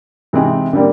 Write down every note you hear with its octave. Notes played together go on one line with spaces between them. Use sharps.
C3 E3 G#3 C4 D#4
D3 G3 A#3